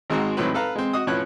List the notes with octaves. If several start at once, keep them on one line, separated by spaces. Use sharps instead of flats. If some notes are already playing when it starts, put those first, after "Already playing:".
G#1 G#3 C4 F#4 A#5
G#1 A2 F#3 C4 B4
A4 B4 F5 A#5
G#3 C4
F#4 D#5 D#6
A2 F3 C#4 B4 C#5 F#6